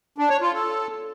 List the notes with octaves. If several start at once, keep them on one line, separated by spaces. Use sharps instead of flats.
D4
C#5
F4
A4